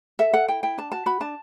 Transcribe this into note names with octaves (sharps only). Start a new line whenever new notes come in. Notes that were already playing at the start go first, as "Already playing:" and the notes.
A4 E5
A4 F#5
E4 G5
E4 G5
D4 A5
F#4 A5
F#4 B5
D4 A5